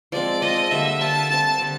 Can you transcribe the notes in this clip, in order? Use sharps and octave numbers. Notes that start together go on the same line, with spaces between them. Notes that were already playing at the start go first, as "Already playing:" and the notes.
F3 G#3 C4 D5
F3 G#3 C4 D#5
D3 G3 A#3 E5
D3 G3 A#3 A5
D3 G3 C4 A5
D3 G3 C4